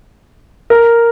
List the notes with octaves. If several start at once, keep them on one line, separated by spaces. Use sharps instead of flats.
A#4